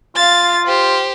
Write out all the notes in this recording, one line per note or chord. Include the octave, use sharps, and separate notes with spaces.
F4 F5 A6
G4 C5